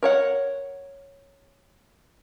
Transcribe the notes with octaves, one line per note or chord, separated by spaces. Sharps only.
A#4 C#5 F#5